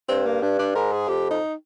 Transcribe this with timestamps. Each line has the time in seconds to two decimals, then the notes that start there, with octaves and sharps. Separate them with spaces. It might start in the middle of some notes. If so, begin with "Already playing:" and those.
0.09 G2 C4
0.25 A#3
0.42 G2 D4
0.59 D4
0.75 G#2 A#4
0.92 G#4
1.09 F2 G4
1.31 D#4